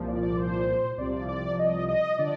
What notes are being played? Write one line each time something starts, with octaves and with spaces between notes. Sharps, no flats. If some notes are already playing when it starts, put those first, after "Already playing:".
Already playing: C2 A#2 F3
D5
D5
C5
C2 C3 F3 D5
D5
D#5
D#5
D3 F3 D5